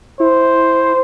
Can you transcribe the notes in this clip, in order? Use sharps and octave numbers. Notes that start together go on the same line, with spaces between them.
E4 C5